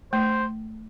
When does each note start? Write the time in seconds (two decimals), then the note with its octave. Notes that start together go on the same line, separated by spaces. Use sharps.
0.13 A3 C5